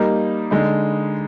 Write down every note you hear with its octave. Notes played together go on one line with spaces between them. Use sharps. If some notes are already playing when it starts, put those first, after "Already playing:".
Already playing: G3 A#3 D#4
D3 G#3 D#4